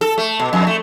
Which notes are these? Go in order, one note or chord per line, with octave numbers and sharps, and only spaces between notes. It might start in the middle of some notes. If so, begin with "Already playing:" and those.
A4
A3
B2
F2
A3